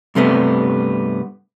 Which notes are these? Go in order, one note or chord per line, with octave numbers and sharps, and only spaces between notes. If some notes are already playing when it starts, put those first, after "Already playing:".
G2 C3 A3 B3